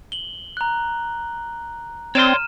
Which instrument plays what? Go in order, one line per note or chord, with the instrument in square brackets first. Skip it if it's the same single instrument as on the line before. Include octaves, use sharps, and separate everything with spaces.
[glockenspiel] F#7 G7
A#5 F#6
[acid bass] C4 [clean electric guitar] C#5 D5 C6 [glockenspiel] F6 D#7 E7